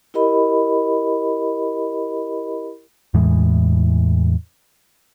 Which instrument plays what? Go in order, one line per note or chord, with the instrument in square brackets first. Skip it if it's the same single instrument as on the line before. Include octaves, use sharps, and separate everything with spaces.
[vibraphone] E4 G4 A#4 D#5 B5
[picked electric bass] E2 A2 E3 G#3